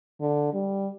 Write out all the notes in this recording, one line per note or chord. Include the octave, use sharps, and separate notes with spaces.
D3
G3